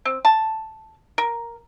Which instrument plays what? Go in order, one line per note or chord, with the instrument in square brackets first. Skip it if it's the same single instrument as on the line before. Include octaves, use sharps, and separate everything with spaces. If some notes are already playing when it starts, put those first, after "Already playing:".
[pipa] C4
A5
A#4